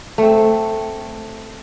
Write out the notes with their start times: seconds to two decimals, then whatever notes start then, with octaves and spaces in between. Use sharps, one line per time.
0.18 A3 C4